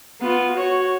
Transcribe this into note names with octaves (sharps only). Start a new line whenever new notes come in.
B3 F4
F#4 C#5